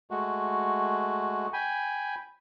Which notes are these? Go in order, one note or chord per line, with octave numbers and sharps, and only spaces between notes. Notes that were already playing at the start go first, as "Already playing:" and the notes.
G#3 A3 F#4
G5 G#5 B5